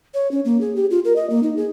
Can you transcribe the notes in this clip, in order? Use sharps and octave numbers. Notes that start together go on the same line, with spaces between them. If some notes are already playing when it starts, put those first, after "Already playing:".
C#5
C#4
A#3
G#4
G4
F4
A#4
D#5
A#3
D#4
G#4